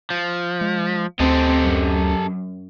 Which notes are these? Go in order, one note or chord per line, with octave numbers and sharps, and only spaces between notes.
F3
G#3
D2 C4 G4 A4 D#5
F#2